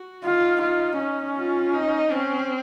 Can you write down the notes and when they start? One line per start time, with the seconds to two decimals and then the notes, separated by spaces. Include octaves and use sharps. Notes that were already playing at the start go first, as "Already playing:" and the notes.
Already playing: F#4
0.23 D#4 F4
0.61 F4
0.99 C#4
1.37 F4
1.74 D#4
2.11 C4 C#4